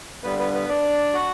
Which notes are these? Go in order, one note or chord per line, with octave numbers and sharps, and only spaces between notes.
G2 D3 G3 B3 B4
B3 B4
B3 B4
D4 D5
F#4 F#5